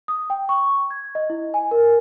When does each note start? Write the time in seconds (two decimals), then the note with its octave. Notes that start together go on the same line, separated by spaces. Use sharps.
0.08 D#6
0.30 G5
0.49 C#6
0.91 G#6
1.15 D#5
1.30 E4
1.54 G#5
1.71 A#4